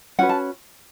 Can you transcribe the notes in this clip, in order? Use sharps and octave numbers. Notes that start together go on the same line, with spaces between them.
C#4 F#4 B4 F#5
A5